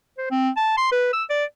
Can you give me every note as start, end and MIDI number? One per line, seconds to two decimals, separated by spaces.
0.18 0.30 72
0.31 0.50 60
0.57 0.77 81
0.77 0.87 84
0.92 1.09 71
1.13 1.24 88
1.30 1.44 74